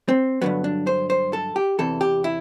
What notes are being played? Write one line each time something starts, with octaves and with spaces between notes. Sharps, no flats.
C4
G2 D3 F#3 B3
D4
C5
C5
A4
G4
E2 C3 E3 A4
G4
E4